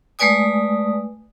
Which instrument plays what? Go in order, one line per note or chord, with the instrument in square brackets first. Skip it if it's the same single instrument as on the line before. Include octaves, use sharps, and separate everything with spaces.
[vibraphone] G#3 A3 B4 D5 G#5 D#6